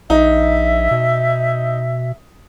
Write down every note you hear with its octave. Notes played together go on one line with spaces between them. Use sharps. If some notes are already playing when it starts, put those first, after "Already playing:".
A#1 D#4 E5
B2